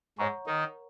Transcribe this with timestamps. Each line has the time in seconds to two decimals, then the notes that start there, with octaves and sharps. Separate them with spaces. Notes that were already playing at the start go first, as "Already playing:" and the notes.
0.18 G#2 G#3 C#5 F#5 A#5 C#6
0.47 D#3 D#4 A#4